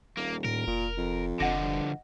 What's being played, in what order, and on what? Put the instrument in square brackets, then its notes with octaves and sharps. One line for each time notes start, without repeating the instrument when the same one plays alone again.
[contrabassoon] D#1 [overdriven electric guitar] A#3
[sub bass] A2 [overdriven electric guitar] A#4 [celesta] D7
[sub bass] F1 [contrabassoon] A#2
[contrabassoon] F2
[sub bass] F1 [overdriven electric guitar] D3 F3 [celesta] D#5 F#5 A#6
[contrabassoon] G2